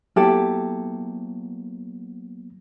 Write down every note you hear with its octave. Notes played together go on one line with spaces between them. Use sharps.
F#3 A#3 B3 E4 G4 A4